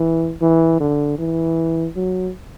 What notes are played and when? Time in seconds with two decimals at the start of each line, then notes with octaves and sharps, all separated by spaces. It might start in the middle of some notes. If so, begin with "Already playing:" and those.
Already playing: E3
0.42 E3
0.80 D3
1.19 E3
1.96 F#3